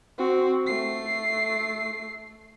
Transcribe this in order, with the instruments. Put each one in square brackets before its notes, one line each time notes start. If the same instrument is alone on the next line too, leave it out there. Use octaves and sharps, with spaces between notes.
[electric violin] C4 F#4
A3 C7